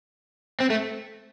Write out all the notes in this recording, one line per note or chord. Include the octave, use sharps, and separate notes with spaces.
C4
A3